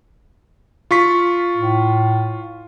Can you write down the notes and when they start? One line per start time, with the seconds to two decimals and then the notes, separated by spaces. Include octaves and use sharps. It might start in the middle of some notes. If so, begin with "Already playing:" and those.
0.91 F4 C#6 B6
1.57 A2